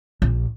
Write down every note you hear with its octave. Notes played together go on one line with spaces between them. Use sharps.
A#1